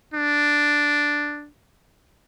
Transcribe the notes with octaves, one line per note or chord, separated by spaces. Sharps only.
D4